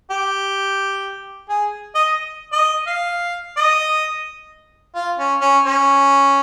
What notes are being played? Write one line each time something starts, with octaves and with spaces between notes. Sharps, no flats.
G4
G#4
D#5
D#5
F5
D#5
F4
C#4
C#4
C#4